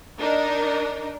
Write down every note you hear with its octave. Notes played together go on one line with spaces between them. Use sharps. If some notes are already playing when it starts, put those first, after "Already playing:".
D4 D#4 A#4